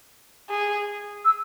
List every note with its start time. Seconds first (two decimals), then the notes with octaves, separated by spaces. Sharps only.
0.50 G#4
1.25 E6